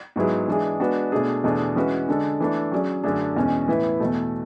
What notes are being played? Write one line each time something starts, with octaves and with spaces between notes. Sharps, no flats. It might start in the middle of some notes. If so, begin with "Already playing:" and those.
G#2 F#3 B3 E4 G#4
E3 G#3 D4 G#4
G#3 B3 D4 F#4
B2 A3 D4 G#4
E2 B2 A3 D4 G#4
E3 G#3 C#4 F#4 B4
D3 G#3 D4 A4
E3 A3 D4
F#3 C#4 G#4 D5
F#2 D3 A3 D4 G#4
E2 B2 G#3 C#4
A2 E3 B3 E4 B4
E2 B2 A3